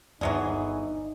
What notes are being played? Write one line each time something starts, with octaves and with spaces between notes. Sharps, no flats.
G1 D#2 E3 F#3 D#4 G#4 D5 E5